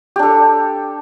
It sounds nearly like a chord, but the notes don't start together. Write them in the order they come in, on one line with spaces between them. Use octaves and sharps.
G4 D4 A4